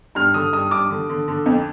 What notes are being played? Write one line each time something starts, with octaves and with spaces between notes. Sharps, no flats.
G2 F6
D3 D#6
G2 D#6
G2 D6
D3
D3
D3
F2